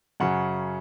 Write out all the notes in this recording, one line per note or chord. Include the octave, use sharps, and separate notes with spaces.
F#2 C#3 F#3 F#5